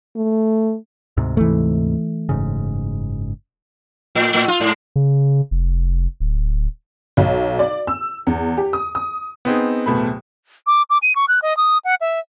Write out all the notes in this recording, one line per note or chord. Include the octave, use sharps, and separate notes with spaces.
A3
D2 G#2 C3
E3 A3
F#1 G#2 C#3
A2
A2
F4
G#2
C#3
F1
D1
B1
D5
E6
E2
G4
D#6
D#6
B3 C4 D#4 G#4
D1 B2 A3 B5
D6
D6
D#7
C#6
F#6
D#5
D#6
F#5
E5